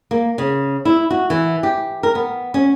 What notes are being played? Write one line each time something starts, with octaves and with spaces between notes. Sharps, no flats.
A#3
C#3
E4
F#4
E3
G4
A#4
B3
C#4